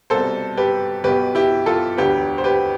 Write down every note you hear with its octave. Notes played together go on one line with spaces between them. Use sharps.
C2 B2 A4 C5
G4 B4
B1 B2 G4 B4
E4 G4
F4 A4
E1 D2 D3 G4 B4
C5
G4 B4